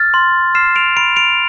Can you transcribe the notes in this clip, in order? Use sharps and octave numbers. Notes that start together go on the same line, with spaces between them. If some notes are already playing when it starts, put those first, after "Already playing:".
Already playing: F6 A6
C6
F6 C7 E7
D7 F7
B5 D7 F7
D7 F7